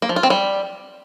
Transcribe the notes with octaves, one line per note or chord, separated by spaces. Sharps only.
A#3
F3
F4
C4
G3